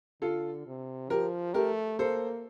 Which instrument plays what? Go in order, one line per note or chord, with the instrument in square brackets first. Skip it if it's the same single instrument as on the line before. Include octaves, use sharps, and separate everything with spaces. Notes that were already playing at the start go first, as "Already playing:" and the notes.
[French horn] D3 [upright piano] F4 A4
[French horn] C3
[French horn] F3 [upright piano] G4 A#4
[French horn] A3 [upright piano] G4 A#4
[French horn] A#3 [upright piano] A4 C5